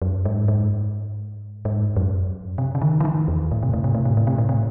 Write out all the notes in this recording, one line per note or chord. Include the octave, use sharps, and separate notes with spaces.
F#2
G#2
G#2
G#2
F#2
C3
C#3
D#3
E3
D#3
E2
A2
C3
A2
C3
A2
C3
A2
C3
A2
C3